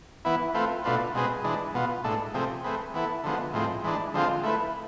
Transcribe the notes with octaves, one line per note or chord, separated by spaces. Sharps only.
E3 B3 E4
A3 C4 F4 B4
B2 A3 D4 F4 B4
B2 G#3 C4 G#4 B4
E3 G#3 D4
B2 B3 F4
A2 G#3 D4 A4
C3 F3 A3 C4 G#4
A3 C4 G#4 B4
E3 B3 E4 A4
D3 F3 G#3 B3
A2 F3 G#3 C4
E3 G#3 D4
D3 F3 G#3 C4 F4
A3 E4 B4